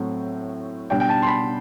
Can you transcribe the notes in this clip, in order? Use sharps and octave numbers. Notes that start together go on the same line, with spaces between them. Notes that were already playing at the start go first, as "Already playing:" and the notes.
Already playing: A2 F#3 A3 C4
B2 G3 D4 G5
G5
A5
C6
B5